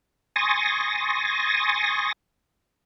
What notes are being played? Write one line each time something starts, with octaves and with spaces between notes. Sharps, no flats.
G#5 C6 C#6 D#6 A6 A#6